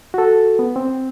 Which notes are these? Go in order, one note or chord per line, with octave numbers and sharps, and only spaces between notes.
F#4 A4
B3
C4